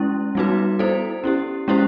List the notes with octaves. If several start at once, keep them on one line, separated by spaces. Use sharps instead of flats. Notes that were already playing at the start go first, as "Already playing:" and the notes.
Already playing: G#3 C#4 E4
G3 B3 D#4 F#4 B4
B3 E4 A4 C5
C#4 E4 G4
G#3 C#4 E4 G4 C5